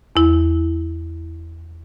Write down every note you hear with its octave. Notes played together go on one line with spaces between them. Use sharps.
E2 E4